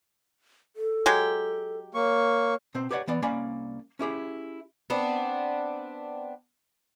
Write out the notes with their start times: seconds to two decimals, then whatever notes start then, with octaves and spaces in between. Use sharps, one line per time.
0.76 A4
1.06 F#3 G#3 G4
1.95 A#3 C#5 C#6
2.74 B2 C4 C5
2.91 G4 B4 C#5 D5 E5 F#5
3.08 E3 B3 D5
3.22 C2 A#3 C#4 D5 G#5 B5
3.99 C#4 E4 G4 G#4
4.90 B3 C4 D4